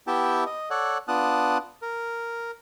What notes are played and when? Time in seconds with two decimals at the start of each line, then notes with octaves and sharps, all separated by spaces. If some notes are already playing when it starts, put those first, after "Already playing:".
0.07 B3 E4 G4 E5 G5 A5
0.46 D#5
0.70 A4 C#5 D5 F#5
1.08 B3 D4 F4 A5 D#6 F#6
1.82 A#4